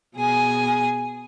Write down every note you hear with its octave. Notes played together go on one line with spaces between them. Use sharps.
B2 G#4 G#5